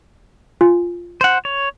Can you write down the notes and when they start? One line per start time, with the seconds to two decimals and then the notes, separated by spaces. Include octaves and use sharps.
0.61 F4 G#5
1.21 C5 F#5
1.45 C#5